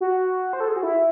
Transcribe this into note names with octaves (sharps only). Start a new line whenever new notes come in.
F#4
C5
A4
G#4
F#4
E4